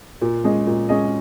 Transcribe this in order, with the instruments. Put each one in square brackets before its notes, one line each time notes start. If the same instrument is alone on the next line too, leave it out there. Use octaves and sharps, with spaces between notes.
[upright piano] A#2
G#3 C#4 G#4 D#5
A#2
G#3 C#4 G#4 D#5